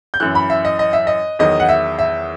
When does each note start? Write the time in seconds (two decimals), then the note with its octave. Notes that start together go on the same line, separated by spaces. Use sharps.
0.14 G6
0.20 F#2 E3 F#6
0.35 B5
0.50 E5
0.65 D#5
0.79 D#5
0.93 E5
1.07 D#5
1.39 E2 D#3 F#3 D#5
1.60 F#5
1.69 E5
1.99 E5